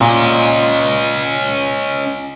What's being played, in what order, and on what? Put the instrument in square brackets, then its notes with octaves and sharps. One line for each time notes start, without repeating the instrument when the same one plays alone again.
[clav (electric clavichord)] A#2 [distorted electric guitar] C#4 D#5